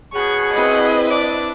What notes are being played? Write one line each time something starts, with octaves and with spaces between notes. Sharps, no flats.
B2 C#4 G#4 F#5 C#6
C4 E4 B4 D#5
D4 D5